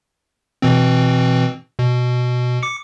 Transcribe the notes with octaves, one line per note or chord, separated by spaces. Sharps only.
B2 E3 C4
B2
D6 C#7